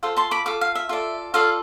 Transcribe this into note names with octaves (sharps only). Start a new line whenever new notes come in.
F4 A4 C5
A5 C6
B5 D6
F4 A4 D6
F5
E5
F4 A4 D5
F4 A4 D5 F5